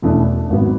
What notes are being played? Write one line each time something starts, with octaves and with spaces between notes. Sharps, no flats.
E1 E2 B2 A3 D4
G#1 G#2 F#3 B3